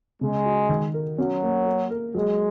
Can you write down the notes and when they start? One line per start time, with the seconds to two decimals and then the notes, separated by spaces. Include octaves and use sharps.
0.21 C#3 G#3
0.45 F#4
0.69 D#3
0.94 A#4
1.18 F#3 C#4
1.43 A#3
1.67 A#4
1.90 A#4
2.14 F#3 G#3